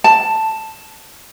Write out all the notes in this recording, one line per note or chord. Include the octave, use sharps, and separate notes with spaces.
A5